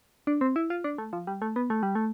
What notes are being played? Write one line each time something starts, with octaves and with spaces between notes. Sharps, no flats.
D4
C4
E4
F4
D4
A3
F3
G3
A3
B3
A3
G3
A3